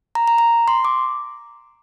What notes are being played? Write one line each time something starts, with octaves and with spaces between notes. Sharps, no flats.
A#5
A#5
A#5
C6
D6